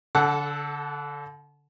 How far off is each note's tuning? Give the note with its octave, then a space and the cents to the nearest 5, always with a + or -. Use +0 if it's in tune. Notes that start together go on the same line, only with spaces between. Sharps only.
D3 -35 A4 +0 F#5 +0